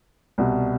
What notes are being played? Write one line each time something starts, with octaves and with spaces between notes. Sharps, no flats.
C2 B2 G3